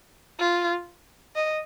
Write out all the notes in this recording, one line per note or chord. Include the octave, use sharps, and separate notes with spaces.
F4
D#5